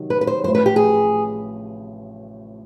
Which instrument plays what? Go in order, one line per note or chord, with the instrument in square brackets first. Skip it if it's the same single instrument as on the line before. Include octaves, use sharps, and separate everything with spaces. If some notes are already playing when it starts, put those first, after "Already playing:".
Already playing: [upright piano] C3 D#3 F#3
[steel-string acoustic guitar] B4
B4
C5
[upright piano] A1 A2 F3 [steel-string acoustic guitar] C5
[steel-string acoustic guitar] B4
G4
G#4